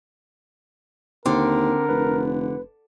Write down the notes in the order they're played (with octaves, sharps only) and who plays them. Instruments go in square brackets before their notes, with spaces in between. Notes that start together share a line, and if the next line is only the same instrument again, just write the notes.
[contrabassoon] D#2 [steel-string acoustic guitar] D3 [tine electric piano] C4 C6 D6 [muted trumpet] A#4
[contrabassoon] F1 [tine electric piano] B4